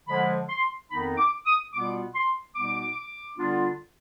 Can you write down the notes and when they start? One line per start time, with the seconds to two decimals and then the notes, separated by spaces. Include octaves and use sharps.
0.08 D3 F3 G#3 B5
0.49 C6
0.91 F2 D#3 B3 D#4 B5
1.18 D6
1.46 D#6
1.73 B2 G3 B3 F4 D6
2.15 C6
2.55 B2 G3 B3 D#4 D6
3.38 D3 G3 B3 D4 F4